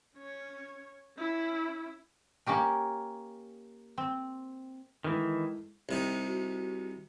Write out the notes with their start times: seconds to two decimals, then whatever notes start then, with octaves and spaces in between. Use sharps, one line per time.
0.16 C#4 C#5
1.17 C#4 E4
2.46 A#3 C#4 G4 A#4
3.98 C4
5.04 D#3 E3 G#3 E4 A4
5.89 C2 C3 D#4
6.26 F#4